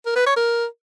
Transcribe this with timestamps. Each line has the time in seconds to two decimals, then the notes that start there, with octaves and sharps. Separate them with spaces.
0.06 A#4
0.16 B4
0.26 C#5
0.36 A#4